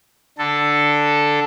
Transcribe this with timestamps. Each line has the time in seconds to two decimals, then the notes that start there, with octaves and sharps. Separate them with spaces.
0.38 D3 A4